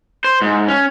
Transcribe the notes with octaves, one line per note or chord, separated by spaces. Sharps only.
C5
G#2
C#4